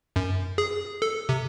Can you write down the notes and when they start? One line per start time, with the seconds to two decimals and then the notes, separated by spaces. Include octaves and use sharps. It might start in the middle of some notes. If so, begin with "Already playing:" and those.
0.16 F#2
0.58 G#4
1.02 A4
1.29 C3